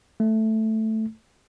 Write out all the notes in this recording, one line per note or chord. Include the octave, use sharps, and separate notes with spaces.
A3